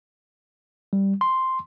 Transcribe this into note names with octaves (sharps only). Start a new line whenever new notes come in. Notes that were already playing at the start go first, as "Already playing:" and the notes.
G3
C6